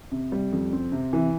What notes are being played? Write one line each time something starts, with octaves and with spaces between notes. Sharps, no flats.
C3
G3
F2
C4
C3
E3